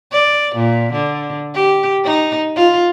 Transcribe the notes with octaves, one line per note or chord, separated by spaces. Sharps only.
D5
A#2
D3
G4
D#4
F4